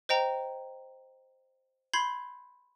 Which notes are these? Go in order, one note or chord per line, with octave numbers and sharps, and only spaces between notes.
C5 D#5 G5 A#5
B5 C6 G6 G#6 C7